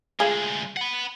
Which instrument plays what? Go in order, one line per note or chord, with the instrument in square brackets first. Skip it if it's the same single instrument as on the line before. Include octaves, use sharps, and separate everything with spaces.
[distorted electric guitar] D2 G#3 [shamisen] E4 F4 G#4
[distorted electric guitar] F#5 B5